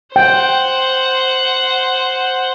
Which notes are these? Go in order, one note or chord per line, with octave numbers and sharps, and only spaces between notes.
C5 F#5 G5